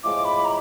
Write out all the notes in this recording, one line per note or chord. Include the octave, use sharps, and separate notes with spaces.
A2 F3 G#3 D6
B5
A#5